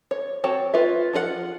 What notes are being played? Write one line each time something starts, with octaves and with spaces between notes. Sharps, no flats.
C#5
C4 F#4 C#5 G5 A5
F4 B4 E5
F3 F4 G#4 F#5